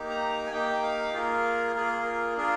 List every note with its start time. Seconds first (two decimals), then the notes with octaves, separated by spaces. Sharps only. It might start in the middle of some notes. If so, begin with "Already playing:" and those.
Already playing: A#3 D#4 G4
0.10 A#5
0.46 G#5
0.51 A#3 D#4 G4 G5
0.82 F5
1.13 A#3 F4 G#4 A#4
1.75 A#3 F4 G#4 A#4
2.02 A#4
2.37 D4 F4 G#4 A#4